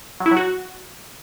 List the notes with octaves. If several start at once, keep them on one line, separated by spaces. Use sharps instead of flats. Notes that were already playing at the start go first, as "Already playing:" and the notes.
F#3
E4
F#3
F#4